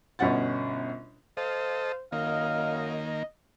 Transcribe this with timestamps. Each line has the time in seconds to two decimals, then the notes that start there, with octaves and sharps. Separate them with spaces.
0.19 G1 B2 C#4 F#5 A6
1.37 A4 C5 D#5 F5
2.12 F#2 D#3 A#3 D#5 F5